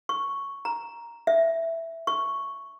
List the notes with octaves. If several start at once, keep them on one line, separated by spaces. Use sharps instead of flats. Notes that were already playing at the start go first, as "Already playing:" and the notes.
C#6
A#5
E5
C#6